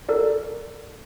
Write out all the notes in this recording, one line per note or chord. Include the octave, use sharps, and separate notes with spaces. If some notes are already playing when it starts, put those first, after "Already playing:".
A4 A#4 D5